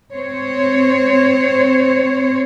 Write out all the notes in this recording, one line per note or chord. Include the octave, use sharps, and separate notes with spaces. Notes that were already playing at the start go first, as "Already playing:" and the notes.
C4 C5 C#5